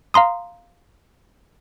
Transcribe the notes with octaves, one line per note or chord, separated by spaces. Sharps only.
F5 A#5 C6 D#6